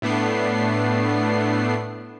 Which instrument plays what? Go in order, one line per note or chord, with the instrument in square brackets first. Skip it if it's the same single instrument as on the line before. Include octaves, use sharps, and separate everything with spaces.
[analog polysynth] A2 A3 B3 D4 C7